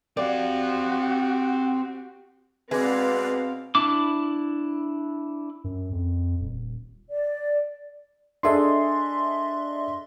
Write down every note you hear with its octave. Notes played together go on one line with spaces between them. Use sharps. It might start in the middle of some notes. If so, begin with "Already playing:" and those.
C4 F#4 G4 D5 F5
B2 G#3 C4 B4 D5 F5 F#5
D4 E4 D6
F#2
F2
D#1
D5
D4 G#4 A4 D#5 E5 C6